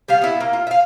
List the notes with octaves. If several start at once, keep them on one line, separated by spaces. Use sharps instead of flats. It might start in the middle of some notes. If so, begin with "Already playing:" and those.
G3 B3 F5
B3 E4
A#3
F4
E5 F5